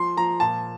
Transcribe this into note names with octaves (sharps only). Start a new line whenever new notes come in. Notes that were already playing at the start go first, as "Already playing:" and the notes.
Already playing: F3 C6
F3 A#5
A#2 A5